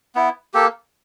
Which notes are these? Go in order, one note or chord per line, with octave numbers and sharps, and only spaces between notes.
B3 E4
A#3 G4 A4